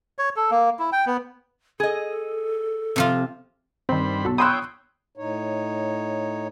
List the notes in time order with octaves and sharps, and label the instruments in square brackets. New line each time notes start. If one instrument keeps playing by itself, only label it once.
[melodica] C#5
A4
A#3
E4
G5
B3
[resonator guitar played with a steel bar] G#4 D#5 [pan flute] A4
[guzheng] C3 F3 F4
[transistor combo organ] G2 C5 B5 [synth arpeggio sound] D#3 C4
[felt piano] B1 [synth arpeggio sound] F#4 A4
[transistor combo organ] C#5 G5 [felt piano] B5 C6 F#6 [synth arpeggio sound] D#6 E6
[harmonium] A2 D#4 C#5